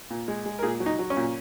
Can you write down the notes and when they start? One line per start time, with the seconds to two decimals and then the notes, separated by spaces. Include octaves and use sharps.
0.10 A#2
0.28 G#3
0.46 G#3
0.59 A#4
0.63 A#2 G#4
0.80 F#3
0.86 D#4
0.99 F#3
1.10 C#4
1.17 A#2